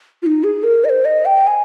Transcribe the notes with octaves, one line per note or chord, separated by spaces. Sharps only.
F4
D#4
G#4
A#4
D#5
C5
D#5
G5
G#5